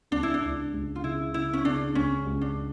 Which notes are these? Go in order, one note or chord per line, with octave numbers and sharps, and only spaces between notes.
C#2 D4
E4
D4
C#2
C#2
F4
C#3 E4
C#3 E4
C#4
C#3 D4
C#2 C#4
C#2
D4